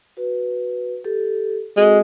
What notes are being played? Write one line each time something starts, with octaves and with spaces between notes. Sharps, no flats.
F#4 B4
G4 A4
G#3 C4 F#4 A4